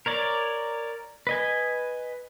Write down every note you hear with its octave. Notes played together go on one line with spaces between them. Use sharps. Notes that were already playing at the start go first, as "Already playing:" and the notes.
A#4 C#5 D5
B4 D#5 G#5